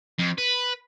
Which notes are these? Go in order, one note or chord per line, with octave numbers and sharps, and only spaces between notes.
F2
B4